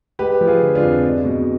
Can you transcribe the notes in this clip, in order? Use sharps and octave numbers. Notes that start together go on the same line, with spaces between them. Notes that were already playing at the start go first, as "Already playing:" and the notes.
G#3 G4 B4
F3
F4 G#4
D3
D4 F4
F2
G#3
B2